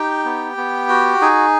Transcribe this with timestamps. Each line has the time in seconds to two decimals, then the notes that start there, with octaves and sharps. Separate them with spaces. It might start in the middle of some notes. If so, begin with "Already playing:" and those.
Already playing: D#4 G4 G5
0.25 B3
0.57 B3
0.89 F#4
1.21 D#4 G#4 G#5